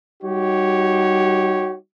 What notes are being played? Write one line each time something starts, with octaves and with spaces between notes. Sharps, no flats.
G3 D#4 F#4 G4 C#5